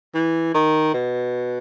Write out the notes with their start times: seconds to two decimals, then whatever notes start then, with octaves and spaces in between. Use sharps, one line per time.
0.15 E3
0.54 D#3
0.94 B2